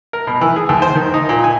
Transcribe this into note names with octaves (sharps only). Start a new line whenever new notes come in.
A#4
B2
E3
G#4
D#2
C5
D#3
D#4
A#2
G#5